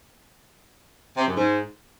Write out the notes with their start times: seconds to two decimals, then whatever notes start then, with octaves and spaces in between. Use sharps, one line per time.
1.17 C3
1.26 F#2
1.36 G#2